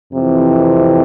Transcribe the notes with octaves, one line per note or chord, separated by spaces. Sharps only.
F2 C3 E3